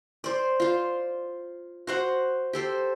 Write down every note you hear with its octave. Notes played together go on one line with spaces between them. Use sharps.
C5 D5
F4 C5
F#4 C5 F#5
G4 A4 C5